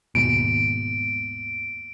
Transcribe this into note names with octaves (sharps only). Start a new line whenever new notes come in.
D#2 G#2 B2 D7